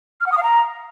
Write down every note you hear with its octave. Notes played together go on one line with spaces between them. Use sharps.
F6
F#5
D#6
F5
A#5